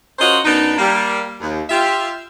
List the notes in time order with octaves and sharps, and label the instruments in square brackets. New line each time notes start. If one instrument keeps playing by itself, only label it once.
[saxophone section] C#4 F4 F#4 A#4 C5 D#5
F#2 B3 D4 D#4
G3 A#3
D#2
F4 G4 E5